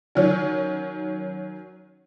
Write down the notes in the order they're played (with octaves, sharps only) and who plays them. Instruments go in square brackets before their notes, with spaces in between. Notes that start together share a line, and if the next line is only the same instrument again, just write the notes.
[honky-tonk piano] D#3 F#3 C#4